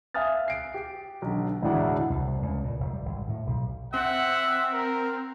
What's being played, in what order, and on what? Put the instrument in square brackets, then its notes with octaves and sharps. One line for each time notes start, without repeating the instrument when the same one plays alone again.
[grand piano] E5 F5 G#5 D#6 F6 A6
C7 D7
G4
B1 D3
E1 D2 A2 D4 E4 F#5
[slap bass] C2
C#2
A#2
F1
G3
G#1
A2
B1
[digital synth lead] C4 [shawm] E5 [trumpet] F#5
[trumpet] A#4